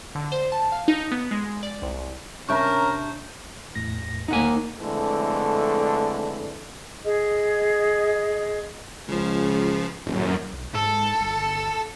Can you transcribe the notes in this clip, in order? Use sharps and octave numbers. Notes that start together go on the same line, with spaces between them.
D3
C5
A5
F5
D#4
B3
G#3
D5
C2
C3 C#4 D4 A#4 E5 C#6 G6
E2 A2 A#6
D#2 A#3 D#4 F#5 G#5
F2 D3 E3 G#3 A3
G#4 D#5
C#2 C#3 F3
D#1 A1 F#2
B1
G#2 A4
G1